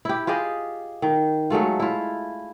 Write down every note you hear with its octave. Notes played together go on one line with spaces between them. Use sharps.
E4 G4
F4 G4 G#4 D#5
D#3
F#3 G#3 A3 F4
E4 F4